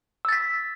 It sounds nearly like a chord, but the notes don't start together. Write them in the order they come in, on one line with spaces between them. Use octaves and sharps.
E6 A6 B6